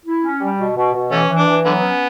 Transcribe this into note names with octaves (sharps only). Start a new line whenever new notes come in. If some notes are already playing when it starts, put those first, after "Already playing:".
E4
C#4
G3
B2
B2
B2
E3 A3 C#4
E3
D4
E3
D3 F#3 B3
C#4